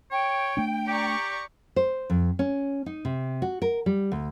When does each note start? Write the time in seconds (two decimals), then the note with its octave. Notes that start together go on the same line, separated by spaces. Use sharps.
0.12 C#5 G5
0.57 A3 D4
0.88 G4 D5 A#5 C#6
1.76 C5
2.10 F2
2.39 C#4
2.86 D#4
3.05 C3
3.42 F#4
3.62 A#4
3.86 G3
4.12 D2